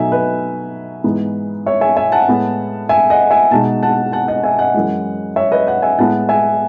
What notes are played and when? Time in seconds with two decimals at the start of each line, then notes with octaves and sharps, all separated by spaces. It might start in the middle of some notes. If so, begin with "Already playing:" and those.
Already playing: B2 F#3 A3 D#4 E5 G#5
0.12 B4 D#5
1.04 G#2 E3 B3 D#4
1.66 C#5 E5
1.81 E5 G#5
1.97 E5 G#5
2.12 F#5 A5
2.28 A2 G#3 B3 E4
2.89 E5 G#5
3.10 D#5 F#5
3.31 E5 G#5
3.51 B2 G#3 D#4 F#5 A5
3.83 F#5 A5
4.12 F#5 A5
4.28 D#5 F#5
4.43 E5 G#5
4.59 D#5 F#5
4.74 F#2 E3 G#3
5.36 C#5 E5
5.52 B4 D#5
5.67 D#5 F#5
5.82 E5 G#5
5.98 A2 G#3 B3 E4 F#5 A5
6.29 E5 G#5